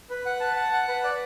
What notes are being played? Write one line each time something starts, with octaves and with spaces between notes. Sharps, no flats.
B4
F#5
A5
F#5
F#5
B4
D5